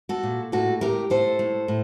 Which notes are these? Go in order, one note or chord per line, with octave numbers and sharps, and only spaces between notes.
F#4 A4
A#2
A2 F#4 A4
A2 G4 A#4
A2 A4 C5
A2
A2